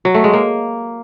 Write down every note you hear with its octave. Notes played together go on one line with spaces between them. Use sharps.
F#3
A3
G#3
A#3